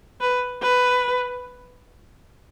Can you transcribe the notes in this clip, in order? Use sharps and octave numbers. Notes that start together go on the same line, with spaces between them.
B4
B4